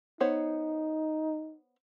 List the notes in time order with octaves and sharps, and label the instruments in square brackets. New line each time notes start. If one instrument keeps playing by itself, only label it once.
[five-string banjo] B3 C5 C#5 [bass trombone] D#4